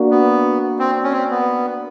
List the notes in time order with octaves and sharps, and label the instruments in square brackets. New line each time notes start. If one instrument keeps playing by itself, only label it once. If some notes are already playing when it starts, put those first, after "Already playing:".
Already playing: [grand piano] A#3 D4 F#4
[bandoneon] B3
C4
C#4
C4
B3